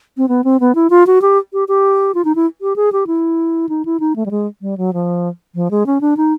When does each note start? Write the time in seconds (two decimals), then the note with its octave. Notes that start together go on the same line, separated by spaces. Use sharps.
0.17 C4
0.29 B3
0.44 C4
0.60 B3
0.75 E4
0.90 F4
1.07 F#4
1.22 G4
1.53 G4
1.68 G4
2.15 F4
2.25 D#4
2.35 E4
2.61 G4
2.76 G#4
2.92 G4
3.07 E4
3.69 D#4
3.85 E4
4.00 D#4
4.16 A3
4.26 G3
4.31 G#3
4.62 G3
4.78 F#3
4.93 F3
5.55 F3
5.71 G#3
5.86 C#4
6.01 D4
6.17 D#4